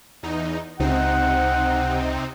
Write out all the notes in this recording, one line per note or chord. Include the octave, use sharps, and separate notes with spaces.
E2 D#4
C#2 C3 C4 D#4 F#5